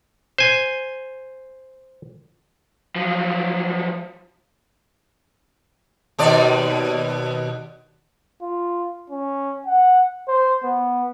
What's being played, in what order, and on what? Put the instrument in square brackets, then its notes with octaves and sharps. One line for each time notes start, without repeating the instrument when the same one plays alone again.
[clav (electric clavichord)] C5 G#5
[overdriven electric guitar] F3 F#3
[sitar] D#2 B2 D5
[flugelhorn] F4
C#4
F#5
C5
B3